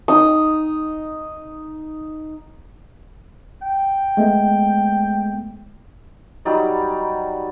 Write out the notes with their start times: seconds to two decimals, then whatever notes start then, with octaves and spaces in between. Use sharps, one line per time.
0.08 D#4 D#6
3.62 G5
4.17 G#3 A3 B3
6.45 F#3 G3 D#4 D5